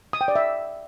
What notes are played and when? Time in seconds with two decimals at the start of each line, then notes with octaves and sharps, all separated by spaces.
0.13 D#6
0.21 G5
0.28 D5
0.36 E5